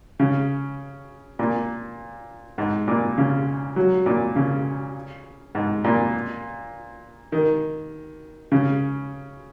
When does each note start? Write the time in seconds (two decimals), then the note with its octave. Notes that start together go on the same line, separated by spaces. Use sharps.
0.19 C#3
1.39 A#2
2.58 G#2
2.88 A#2
3.18 C#3
3.76 F#3
4.06 A#2
4.36 C#3
5.55 G#2
5.84 A#2
7.32 D#3
8.52 C#3